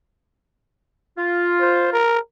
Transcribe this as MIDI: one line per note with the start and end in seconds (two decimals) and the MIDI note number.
1.18 1.98 65
1.61 1.89 72
1.93 2.19 70